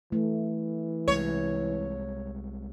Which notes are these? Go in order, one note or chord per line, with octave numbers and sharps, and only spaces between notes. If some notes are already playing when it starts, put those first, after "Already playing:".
E3 A3
C2 C3 G#3 C#5